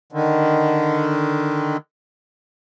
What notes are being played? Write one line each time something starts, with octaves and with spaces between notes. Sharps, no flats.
D3 D#3